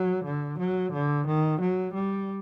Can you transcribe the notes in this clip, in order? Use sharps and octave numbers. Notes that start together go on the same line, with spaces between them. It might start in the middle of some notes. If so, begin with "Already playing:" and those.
Already playing: F#3
D3
F#3
D3
D#3
F#3
G3